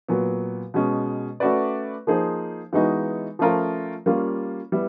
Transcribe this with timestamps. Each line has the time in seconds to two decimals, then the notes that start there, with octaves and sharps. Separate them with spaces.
0.08 A#2 F#3 B3
0.74 B2 G#3 C#4
1.40 A3 C#4 F#4 B4 D5
2.07 F3 A#3 D#4 G#4 C5
2.73 E3 G#3 B3 D#4 F#4
3.39 F3 A3 C#4 F4 A#4
4.06 G3 A#3 C#4 F4
4.72 G3 B3 E4